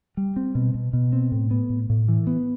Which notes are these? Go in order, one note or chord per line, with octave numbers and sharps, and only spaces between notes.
G3
C4
B2
B2
B2
C4
A2
B3
A2
A2
E3
B3